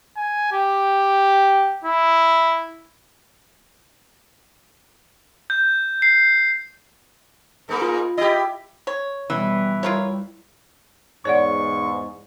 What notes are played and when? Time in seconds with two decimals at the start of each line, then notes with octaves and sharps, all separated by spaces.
0.17 G#5
0.52 G4
1.84 E4
5.50 G6
6.02 C7
7.69 G#2 A#3 A#4
7.82 F4
8.18 E4 G4 D#5
8.87 C#5
9.30 B2 E3 G3
9.83 G3 E4 F4 A#4 C#5
11.25 E2 G#2 C#5 D5 F#5 C#6